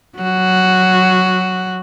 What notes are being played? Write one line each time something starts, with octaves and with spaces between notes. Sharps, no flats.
F#3 F#4